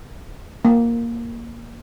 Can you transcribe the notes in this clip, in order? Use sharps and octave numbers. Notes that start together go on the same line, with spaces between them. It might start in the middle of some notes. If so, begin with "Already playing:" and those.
A#3